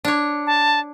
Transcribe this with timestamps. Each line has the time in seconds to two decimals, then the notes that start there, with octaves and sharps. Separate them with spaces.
0.05 D4 C#5
0.47 A5